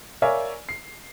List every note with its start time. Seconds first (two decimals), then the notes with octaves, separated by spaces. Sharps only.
0.22 A#4 C#5 D5 E5 F5 G#5
0.69 C7